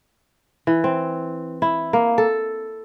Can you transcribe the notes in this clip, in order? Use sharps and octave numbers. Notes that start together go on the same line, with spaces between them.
E3
C4
E4
A#3
A4